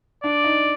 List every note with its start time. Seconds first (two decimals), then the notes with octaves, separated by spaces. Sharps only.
0.23 D4 D5
0.44 D#4